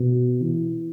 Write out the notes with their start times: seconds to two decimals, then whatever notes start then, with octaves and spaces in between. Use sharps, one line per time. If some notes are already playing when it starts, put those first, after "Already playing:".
Already playing: B2
0.42 E3